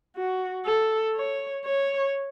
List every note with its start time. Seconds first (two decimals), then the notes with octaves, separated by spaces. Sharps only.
0.17 F#4
0.66 A4
1.15 C#5
1.65 C#5